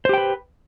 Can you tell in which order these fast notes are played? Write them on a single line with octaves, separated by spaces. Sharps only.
C5 G4 G5 B4